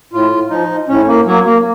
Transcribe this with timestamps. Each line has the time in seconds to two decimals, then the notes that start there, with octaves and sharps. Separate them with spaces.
0.13 A2 F4
0.50 F3 D#4
0.89 A2 C#4
1.08 A#3
1.26 F#3 A#3
1.45 A#3